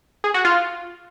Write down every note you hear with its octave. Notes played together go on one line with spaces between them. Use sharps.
G#4
F#4
F4